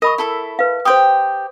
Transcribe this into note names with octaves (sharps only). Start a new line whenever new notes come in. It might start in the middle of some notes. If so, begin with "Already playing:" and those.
A#4 D#5 B5 C#6
E4 A4 E5
B4 F5
G4 C5 G5 C6 D#6